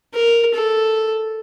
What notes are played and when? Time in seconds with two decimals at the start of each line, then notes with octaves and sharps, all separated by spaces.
0.14 A#4
0.54 A4